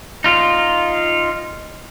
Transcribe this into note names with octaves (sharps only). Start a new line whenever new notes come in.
D#4 F4